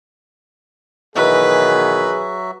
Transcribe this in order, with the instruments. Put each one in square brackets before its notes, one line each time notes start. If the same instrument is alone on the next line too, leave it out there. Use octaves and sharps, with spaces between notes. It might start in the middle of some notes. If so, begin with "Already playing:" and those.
[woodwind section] B2 D#3 E3 [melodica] F#3 F#4 E5 [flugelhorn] G#4 [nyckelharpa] B4